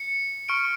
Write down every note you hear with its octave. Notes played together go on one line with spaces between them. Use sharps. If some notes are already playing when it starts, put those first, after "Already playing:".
Already playing: C#7
C#6 F6 D7